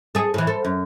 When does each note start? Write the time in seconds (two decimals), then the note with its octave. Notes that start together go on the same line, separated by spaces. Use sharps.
0.15 G#4 A4
0.34 A2 E3
0.47 A4 C5
0.65 F#2